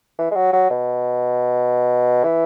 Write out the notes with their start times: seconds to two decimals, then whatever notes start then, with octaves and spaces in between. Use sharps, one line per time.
0.19 E3
0.31 G#3
0.36 F#3
0.53 F#3
0.70 B2
2.24 E3